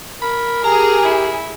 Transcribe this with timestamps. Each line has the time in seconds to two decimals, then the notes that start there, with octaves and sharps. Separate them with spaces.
0.22 A#4 B5
0.64 G4 G#4 A#5
1.05 E4